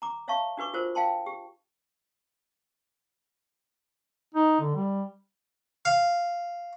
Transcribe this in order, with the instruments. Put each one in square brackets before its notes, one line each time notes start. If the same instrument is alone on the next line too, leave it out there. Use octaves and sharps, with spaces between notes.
[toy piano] A#5 D6
C#5 E5 F5 A5 C#6
D4 F#4 B4 C#6 D6
F4 F#4 A#4 C5
F5 G5 A5 C6
G4
[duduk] D#4
D3
G3
[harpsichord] F5